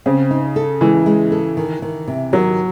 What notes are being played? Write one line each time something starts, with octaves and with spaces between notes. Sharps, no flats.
C#3 C4
D#4
A4
E3 G#3
G#3
A4
D#3
D#3
C3
D#3 F#3